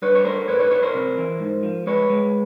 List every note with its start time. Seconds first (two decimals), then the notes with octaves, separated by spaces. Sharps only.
0.02 G2 B4 C#5
0.15 C#5
0.25 A3 A#4 C5
0.48 A2 B4 C#5
0.60 B4 C#5
0.71 A2 B4 C#5
0.83 A#4 C5
0.94 C3
1.18 E3
1.40 G#2
1.63 F3
1.87 G#3 B4 C#5
2.10 G#3